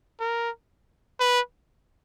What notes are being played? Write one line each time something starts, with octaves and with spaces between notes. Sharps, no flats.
A#4
B4